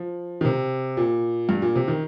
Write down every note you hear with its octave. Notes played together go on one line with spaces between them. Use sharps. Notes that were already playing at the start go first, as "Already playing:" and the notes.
Already playing: F3
D#3
C3
A#2
G2
A#2
C3
D#3